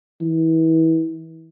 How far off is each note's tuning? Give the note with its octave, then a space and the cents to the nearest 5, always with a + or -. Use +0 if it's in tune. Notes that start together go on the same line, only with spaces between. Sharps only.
E3 -30